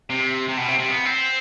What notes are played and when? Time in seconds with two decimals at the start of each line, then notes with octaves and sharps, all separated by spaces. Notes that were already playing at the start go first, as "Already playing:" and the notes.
0.10 C3
0.49 C3
0.57 B2
0.68 C3
0.79 C3
0.89 B3
1.06 C4